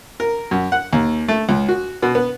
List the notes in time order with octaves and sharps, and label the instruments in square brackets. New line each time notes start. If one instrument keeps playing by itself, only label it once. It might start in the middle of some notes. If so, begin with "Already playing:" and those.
[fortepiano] A#4
F#2
F#5
D#2
A3
C#2
F#4
B2
B3